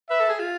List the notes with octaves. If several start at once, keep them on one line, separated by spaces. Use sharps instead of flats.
B4 E5
A4
G#4
F4